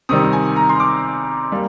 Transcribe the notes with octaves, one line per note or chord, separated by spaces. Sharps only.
C3 D#3 G3 D#6
G#5
A#5
C6
D6
G3 A#3